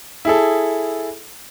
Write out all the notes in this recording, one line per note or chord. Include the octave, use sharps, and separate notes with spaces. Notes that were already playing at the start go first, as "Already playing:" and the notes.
E4 G#4 A4